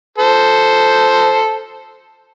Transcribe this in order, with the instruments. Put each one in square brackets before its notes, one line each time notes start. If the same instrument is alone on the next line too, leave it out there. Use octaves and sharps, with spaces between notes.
[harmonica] A4 C5